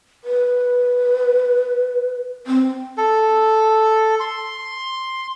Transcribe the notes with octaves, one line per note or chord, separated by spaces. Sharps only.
B4
C4
A4
C6